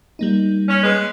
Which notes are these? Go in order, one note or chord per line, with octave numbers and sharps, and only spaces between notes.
G3 A#3 D#4
C#4
G#3 B4